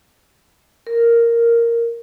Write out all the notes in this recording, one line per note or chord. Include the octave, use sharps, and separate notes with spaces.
A#4